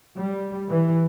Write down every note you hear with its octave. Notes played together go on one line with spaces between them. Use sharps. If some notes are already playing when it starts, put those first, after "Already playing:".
G3
E3